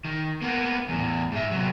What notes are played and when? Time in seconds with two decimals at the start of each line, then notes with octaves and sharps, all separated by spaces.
0.05 D#3
0.42 A#3 B3
0.89 E2 A2
1.32 G#2 E5
1.51 C3 F#3